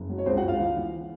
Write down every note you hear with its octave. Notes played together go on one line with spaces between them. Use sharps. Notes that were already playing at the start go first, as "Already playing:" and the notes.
Already playing: F#1
F#3
C#5
C#2 C4 C5
F#4 F#5
C#2
F4 F5
E3
E3